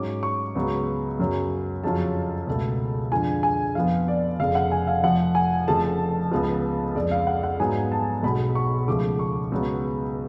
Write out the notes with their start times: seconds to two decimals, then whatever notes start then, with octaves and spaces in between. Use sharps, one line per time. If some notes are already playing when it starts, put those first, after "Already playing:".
Already playing: G#2 F#3 C#4 D6
0.23 C#6
0.55 C#2 C#3 F#3 B3
1.19 F#2 C#3 F#3
1.83 F2 C#3 F#3 C#4 F4 A5
2.47 C#2 B2 A3
3.11 F2 D3 G#3 D4 F4 G#5
3.43 G#5
3.75 F2 F3 B3 F5
4.08 D5
4.40 F1 F2 C#3 F5
4.55 F#5
4.72 G#5
4.87 F5
5.03 F1 F2 F3 F#5
5.35 G#5
5.67 F1 F2 C#3 F3 A3 A5
6.31 C#2 C#3 F3 B3 F4
6.95 F2 C#3 G#3 D5
7.11 F5
7.27 F#5
7.43 F#5
7.59 G#2 F#3 B3 G#5
7.92 A5
8.23 B1 B2 G#3 B5
8.55 C#6
8.87 C#2 C#3 F3 A3 D6
9.19 C#6
9.52 C#2 C#3 F#3 B3